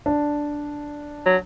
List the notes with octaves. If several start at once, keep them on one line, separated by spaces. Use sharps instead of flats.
D4
F#3